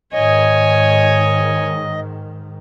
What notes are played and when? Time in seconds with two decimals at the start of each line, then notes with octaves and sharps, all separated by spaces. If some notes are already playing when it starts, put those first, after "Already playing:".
0.13 G#2 D#3 C#5 D#5 G#5